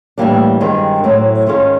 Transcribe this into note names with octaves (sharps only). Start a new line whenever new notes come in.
A2 E3 G3 A#3 D4
G2 D#3 G#3 C4
A2 F#3 A3 C4
G#2 D#3 G#3 C#4 F4